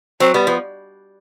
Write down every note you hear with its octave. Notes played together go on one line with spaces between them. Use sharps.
F#3 C4
G3 B3
F3 B3